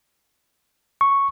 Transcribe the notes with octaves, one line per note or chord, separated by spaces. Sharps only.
C#6